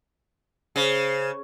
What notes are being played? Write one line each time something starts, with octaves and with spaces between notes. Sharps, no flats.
C#3 C5